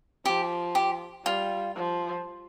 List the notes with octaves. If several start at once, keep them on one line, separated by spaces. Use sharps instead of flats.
F3 G4
G4
G3 F4
F3